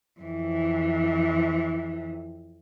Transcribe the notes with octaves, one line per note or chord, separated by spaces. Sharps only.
F2 E3